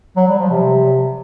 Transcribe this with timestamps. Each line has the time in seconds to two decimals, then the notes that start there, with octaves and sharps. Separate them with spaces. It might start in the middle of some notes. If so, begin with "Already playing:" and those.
0.16 F#3
0.28 G3
0.39 F3
0.50 C3